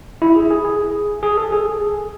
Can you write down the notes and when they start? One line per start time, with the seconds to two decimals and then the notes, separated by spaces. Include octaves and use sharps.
0.22 E4
0.36 G#4
0.51 G#4
0.65 G#4
1.23 G#4
1.38 A4
1.52 G#4